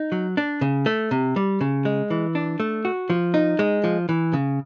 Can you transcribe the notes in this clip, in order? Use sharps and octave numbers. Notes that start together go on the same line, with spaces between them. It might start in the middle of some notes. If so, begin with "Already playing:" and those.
Already playing: D#4
F#3
D4
C#3
A3
C3
G3
C#3
G#3
E3
D4
A3
F#4
F3
D#4
G#3
F3
E3
C#3